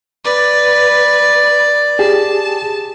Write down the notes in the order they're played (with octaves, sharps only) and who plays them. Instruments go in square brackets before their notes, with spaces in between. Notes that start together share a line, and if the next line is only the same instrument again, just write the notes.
[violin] B4 [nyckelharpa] D5
[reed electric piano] G4 G#4 [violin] A5